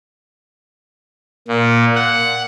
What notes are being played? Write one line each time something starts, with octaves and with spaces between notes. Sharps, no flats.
A#2
F#5